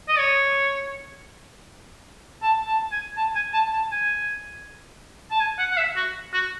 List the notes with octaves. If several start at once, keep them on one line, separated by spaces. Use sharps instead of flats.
D#5
C#5
A5
A5
G#5
A5
G#5
A5
A5
G#5
A5
G#5
F#5
F#5
E5
F#4
F#4